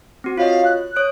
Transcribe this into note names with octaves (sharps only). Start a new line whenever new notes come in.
C4 F#4
F4 C#5 D#5 F5
F#6
C#5 D#6 D7